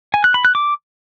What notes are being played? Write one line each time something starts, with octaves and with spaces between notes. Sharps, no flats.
G#5
F#6
B5
F#6
D6